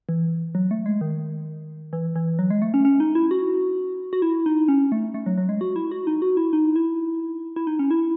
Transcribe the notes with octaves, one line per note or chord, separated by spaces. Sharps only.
E3
F#3
A3
G#3
D#3
E3
E3
F#3
G#3
A3
C#4
C#4
D#4
E4
F#4
F#4
E4
D#4
C#4
A3
A3
F#3
F#3
G#3
F#4
E4
F#4
D#4
F#4
E4
D#4
E4
E4
D#4
C#4
E4